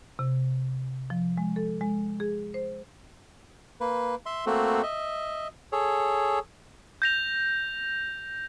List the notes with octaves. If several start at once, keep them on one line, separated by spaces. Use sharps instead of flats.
C3
F3
G#3
A4
G#3
G#4
C5
A#3 B4
E5 C6
A3 A#3 C4 F#4 A4
D#5 E5
G#4 A4 C#5
G6 A#6 F7